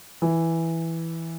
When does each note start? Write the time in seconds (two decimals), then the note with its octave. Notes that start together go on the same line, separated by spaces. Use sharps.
0.22 E3